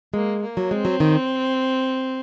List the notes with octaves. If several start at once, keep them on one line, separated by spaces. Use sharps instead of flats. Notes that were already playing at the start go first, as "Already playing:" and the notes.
G#3 A#3
A#3
F#3
G#3 C4
F#3
D#3